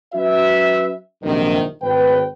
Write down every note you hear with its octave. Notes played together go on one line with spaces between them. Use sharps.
F#3 C#4 F#4 B4 E5
A#1 F#2 C3 D#3
G#1 B4 G5